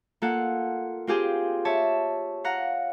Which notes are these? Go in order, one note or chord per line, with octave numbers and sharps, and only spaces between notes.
A#3 F4 A4 F#5
C4 F4 G4 G#4
C#5 E5 A5
F5 F#5 A#5